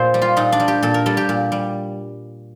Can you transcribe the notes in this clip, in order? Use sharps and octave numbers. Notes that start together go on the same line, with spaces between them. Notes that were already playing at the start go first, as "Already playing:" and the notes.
Already playing: A#2 C5
G3
F4
A#2 D#4
D4
G3
G4
A#2 A4
A#4
G3 A4
G4
A#2
G3